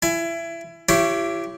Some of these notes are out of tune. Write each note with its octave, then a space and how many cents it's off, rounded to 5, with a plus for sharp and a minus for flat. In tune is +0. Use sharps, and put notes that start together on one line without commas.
E4 +25 G#5 +15
E4 +35 G4 -10 C#5 +0